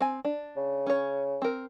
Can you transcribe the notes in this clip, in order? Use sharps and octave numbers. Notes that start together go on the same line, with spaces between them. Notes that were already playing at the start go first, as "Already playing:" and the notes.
C4 G#5
D4
C#3
C#4 C#5
C4 A#4